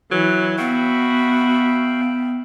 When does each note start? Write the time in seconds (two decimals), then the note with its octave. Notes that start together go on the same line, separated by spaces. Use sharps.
0.12 E3 F#3
0.58 B3 F#4 E5 F5 G5 B5